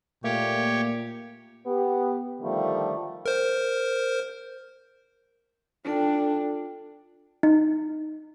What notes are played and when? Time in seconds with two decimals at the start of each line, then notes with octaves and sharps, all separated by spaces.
0.24 A#2 A3 A#3 G4 C#5
1.67 B3 G4
2.41 D3 D#3 F3 G3 A3
3.26 A#4 C5
5.85 D4 F4 A4 G5
7.43 D#4